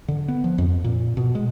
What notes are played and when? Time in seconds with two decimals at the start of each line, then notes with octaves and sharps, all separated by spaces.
0.08 D3
0.28 B3
0.44 F3
0.58 F2
0.84 A#2
1.17 B2
1.35 G#3